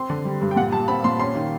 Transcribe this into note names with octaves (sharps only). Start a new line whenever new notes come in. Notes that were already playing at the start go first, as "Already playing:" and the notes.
Already playing: C4 C6
D3
G3
G2
G5
A#2 F#5
G3 A5
C4 B5
A#2 C6
C#4 C6
D#3